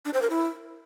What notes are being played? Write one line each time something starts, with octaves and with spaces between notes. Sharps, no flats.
D4
C5
A#4
E4